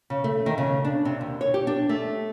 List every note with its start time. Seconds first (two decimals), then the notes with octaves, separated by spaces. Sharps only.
0.10 C#3
0.24 A3
0.46 D#3
0.58 C#3
0.85 D4
1.05 C3
1.21 D#2
1.41 C#5
1.54 G4
1.67 D4
1.89 A3